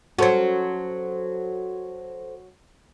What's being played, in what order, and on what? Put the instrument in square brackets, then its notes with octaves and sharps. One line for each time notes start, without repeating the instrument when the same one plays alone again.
[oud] F#3 C#4 [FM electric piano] F#4 A4 C5